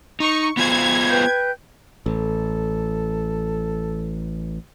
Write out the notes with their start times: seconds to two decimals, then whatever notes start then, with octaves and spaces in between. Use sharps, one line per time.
0.20 D#4 C#6
0.57 B3 F4 C5 G#6
1.09 B4 G5 G6
2.06 A1 A4